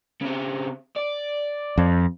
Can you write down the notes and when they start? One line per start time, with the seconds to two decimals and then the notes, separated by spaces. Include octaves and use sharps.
0.21 C#3 C4
0.96 D5
1.78 F2